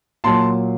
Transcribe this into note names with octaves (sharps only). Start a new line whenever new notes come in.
A#2 F#3 A5 C6